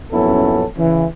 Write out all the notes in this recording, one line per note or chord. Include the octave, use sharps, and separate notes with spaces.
A#1 F#2 B3 C#4 E4 A4
C#3 E3